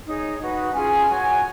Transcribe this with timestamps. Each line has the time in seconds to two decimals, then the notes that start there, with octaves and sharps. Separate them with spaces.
0.04 D#4 G#4 C#5
0.38 D#4 F#4 B4
0.72 C#4 F4 G#4 G#5
1.07 F#4 C#5